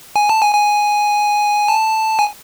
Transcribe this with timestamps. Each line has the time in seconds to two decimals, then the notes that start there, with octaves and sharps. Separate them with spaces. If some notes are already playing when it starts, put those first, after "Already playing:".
0.16 G#5
0.29 A5
0.41 G#5
0.55 G#5
1.68 A5
2.19 G#5